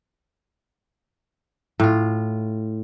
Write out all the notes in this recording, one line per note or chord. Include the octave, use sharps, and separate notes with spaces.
A2 F4